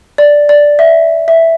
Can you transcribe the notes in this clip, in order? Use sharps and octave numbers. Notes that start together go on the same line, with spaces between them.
D5
D5
E5
E5